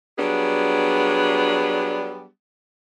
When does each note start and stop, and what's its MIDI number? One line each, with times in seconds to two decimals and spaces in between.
0.18 2.26 54
0.18 2.26 55
0.18 2.26 59
0.18 2.26 62
0.18 2.26 68